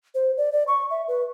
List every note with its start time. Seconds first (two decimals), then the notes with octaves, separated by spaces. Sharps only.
0.15 C5
0.37 D5
0.52 D5
0.68 C#6
0.90 E5
1.08 B4